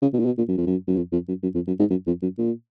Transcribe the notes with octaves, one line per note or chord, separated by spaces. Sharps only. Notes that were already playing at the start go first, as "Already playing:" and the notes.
C#3
B2
A#2
B2
A#2
F#2
F2
F#2
F#2
F2
F2
F#2
F#2
F2
F#2
G#2
F#2
F2
F#2
A#2